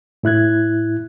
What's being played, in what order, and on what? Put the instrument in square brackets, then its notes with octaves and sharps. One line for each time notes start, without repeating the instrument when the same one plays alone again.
[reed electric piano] A2 E4 F#6 G#6